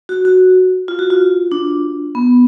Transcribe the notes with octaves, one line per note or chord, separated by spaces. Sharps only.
F#4
F#4
F4
F#4
F4
D4
B3